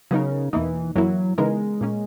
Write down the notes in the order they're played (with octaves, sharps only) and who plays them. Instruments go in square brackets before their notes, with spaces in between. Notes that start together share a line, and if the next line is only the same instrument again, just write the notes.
[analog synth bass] C#3 [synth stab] F#3 B3 D#4 A#4
[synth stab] E2 B2 A#3 D#4 [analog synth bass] E3
[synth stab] F#2 E3 A#3 E4 [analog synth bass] F#3
[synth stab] C#3 E3 B3 D#4 A#4 [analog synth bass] G#3
[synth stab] A#2 A#3 C#4